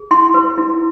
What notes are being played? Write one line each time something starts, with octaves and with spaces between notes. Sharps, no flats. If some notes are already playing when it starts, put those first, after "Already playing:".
Already playing: G#4
E4 C6
B4
E4